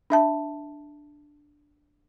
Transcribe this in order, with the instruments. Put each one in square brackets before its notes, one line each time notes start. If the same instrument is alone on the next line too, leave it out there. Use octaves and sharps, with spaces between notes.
[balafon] D4 E5 A5